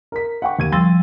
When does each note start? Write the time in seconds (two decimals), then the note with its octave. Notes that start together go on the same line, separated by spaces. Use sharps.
0.12 A#4 B6
0.42 F#5 G5 C#6
0.59 D#2 G#6 D#7
0.72 F3 G3 C6 E6 A6